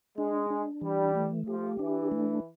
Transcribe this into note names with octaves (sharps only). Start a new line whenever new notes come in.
G#3 D4
D4
E3 G3
A3
F3 G4
E3 D4
A3